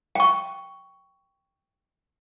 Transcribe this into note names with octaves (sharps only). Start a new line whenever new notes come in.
G5 C#6